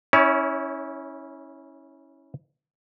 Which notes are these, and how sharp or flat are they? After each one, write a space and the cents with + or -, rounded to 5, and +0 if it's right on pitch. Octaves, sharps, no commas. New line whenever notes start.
C#4 -5 E4 -25 C#5 +30